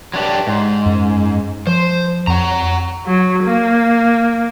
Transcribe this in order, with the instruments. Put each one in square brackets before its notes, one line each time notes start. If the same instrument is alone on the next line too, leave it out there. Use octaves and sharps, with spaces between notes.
[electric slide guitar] F#3 D4 G4
G#2
[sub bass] F#2
[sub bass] F3 [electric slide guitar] C5
[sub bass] F2 [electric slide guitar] F#5 A#5
[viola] F#3
A#3